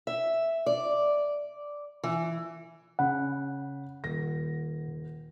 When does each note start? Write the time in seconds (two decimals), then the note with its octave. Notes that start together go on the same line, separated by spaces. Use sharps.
0.07 E5
0.66 D5
2.04 E3
2.99 C#3 F#5 B5
4.03 D#1 A#6